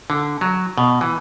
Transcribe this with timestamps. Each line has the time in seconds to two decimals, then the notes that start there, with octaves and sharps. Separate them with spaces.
0.10 D3
0.41 F#3
0.78 B2
1.01 E3